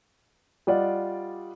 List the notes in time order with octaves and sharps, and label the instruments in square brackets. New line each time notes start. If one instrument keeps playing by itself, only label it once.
[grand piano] G3 F4 D5 D#5 F#5